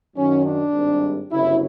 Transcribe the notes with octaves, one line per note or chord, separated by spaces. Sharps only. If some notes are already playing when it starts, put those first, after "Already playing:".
F#2 D#3 F#3 C#4
D4
G#1 G2 D#3 G3
G1 F#2 C#3 F#3 E4